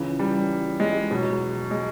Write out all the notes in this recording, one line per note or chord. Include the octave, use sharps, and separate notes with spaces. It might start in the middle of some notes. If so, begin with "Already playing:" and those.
Already playing: C#2 C#3 E3
G3
G#3
E2 B2 F#3
G#3